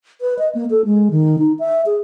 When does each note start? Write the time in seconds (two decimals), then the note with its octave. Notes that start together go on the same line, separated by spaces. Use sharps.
0.21 B4
0.39 D#5
0.55 A#3
0.70 A4
0.85 G#3
1.11 D#3
1.39 D#4
1.59 E5
1.86 G#4